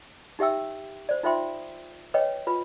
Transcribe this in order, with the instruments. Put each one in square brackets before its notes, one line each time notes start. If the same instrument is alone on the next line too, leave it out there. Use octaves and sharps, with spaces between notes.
[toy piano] D#4 G4 E5 G5 E6
C5 D5
D#4 F4 C5 E5 G5 C6
B4 C#5 D#5 G5
F4 B4